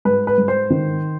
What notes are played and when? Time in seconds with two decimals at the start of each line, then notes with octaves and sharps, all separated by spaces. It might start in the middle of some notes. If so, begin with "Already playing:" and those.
0.05 G#2 B4
0.27 B4
0.38 G#2
0.48 C5
0.70 D#3